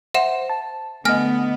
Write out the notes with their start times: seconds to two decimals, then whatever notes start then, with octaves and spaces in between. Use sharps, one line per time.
0.14 C5 E5 F#5 E7
0.50 A5
1.05 D3 A3 B3 D#5 G#5 F6 A#6